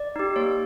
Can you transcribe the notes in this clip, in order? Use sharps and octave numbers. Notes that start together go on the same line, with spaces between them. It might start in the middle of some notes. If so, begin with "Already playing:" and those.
Already playing: D5
D#4 G4
A#3 C#5